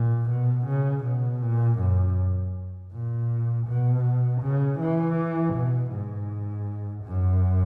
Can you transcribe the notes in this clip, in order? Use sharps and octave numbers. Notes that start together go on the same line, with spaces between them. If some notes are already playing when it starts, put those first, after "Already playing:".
Already playing: A#2
B2
C#3
B2
A#2
F#2
A#2
B2
C#3
E3
B2
G#2
F#2